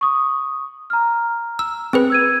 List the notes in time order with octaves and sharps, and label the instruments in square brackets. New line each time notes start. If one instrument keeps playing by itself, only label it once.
[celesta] C#6 D#6
A#5 F6
[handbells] E6
C4 G#4 B4
[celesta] E6 G#6 D#7